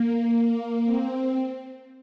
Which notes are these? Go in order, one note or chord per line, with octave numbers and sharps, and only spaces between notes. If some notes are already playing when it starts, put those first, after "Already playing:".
Already playing: A#3
C4